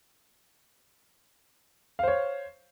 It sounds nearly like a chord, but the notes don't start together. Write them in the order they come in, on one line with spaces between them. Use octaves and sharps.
F5 C5 C#5